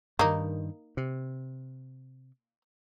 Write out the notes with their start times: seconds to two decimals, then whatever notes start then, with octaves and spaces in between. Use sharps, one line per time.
0.19 G2 D#3 A#3 D#4
0.97 C3